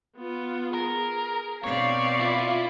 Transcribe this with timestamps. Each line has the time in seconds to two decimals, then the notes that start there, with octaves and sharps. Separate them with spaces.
0.17 B3 F4
0.74 G#4 A#4
1.64 B2 C4 C#5 D5 F5
2.20 E4 F4